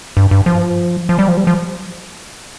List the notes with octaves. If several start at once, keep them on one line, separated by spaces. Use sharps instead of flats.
G2
G2
F3
F3
G3
F3
G3
F3